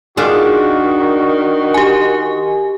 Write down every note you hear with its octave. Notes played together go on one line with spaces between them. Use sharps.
D#3 D4 F4 F#4 G#4
G4 G#5